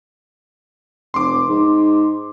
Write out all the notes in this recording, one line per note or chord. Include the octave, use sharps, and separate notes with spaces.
F1 C6 D6
G#2